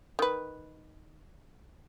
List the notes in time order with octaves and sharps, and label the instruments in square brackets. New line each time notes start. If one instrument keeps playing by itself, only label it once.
[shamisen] D#3 B4